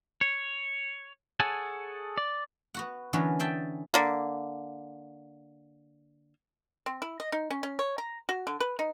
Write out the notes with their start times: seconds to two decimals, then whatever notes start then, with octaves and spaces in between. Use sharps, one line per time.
0.21 C#5
1.40 G#4 A4 C#5 F#5 G#5 A5
2.18 D5
2.74 B3 F#4 F#5
3.13 D3 E3 F#3 B3 C#4 A#4
3.39 G#4 E5 G5 A5
3.94 D3 A#3
6.86 C4
7.02 E4
7.20 D#5
7.32 D#4
7.50 C#4
7.63 C#4
7.79 C#5
7.98 A#5
8.29 F#4
8.47 D3
8.60 B4
8.79 D#4